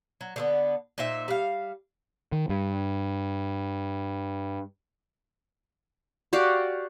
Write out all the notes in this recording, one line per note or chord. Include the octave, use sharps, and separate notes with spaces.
F#3
D3 A3 B3
A#2 D#4 C5 E5
G3 F5
D#3
G2
F#4 G4 D5 F5